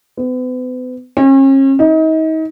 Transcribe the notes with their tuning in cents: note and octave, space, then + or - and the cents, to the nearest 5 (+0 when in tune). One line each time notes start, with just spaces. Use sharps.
B3 +40
C#4 -40
D#4 +35